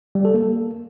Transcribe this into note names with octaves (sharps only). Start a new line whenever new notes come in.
G3
A4
A#3